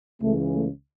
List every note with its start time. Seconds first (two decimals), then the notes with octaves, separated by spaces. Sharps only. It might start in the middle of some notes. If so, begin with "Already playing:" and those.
0.22 C#2 C#3 E3 A3
0.54 A3